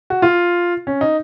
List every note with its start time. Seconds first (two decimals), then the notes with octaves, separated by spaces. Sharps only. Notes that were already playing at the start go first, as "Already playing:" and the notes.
0.10 F#4
0.22 F4
0.87 C#4
1.01 D#4